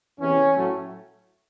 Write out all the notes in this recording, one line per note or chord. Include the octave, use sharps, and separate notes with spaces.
E2 C3 E3 C#4
A2 F#3 A3